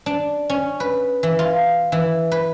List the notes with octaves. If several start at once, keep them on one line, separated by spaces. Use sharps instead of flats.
D4
C#4
B4
E3
F4
E3
B4